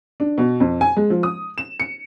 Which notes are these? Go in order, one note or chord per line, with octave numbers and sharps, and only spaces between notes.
D4
B2
F2
G#5
G#3
F3
D#6
E7
C#7